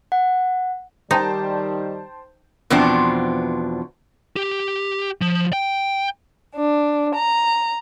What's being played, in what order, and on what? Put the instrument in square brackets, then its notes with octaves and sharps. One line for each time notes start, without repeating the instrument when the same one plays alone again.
[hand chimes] F#5
[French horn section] D#3 G3 [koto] D#4 [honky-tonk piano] C5 G5 A5
[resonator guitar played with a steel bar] E2 B2 F3 B3 C4 D4
[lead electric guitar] G4
F3
G5
[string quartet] D4
A#5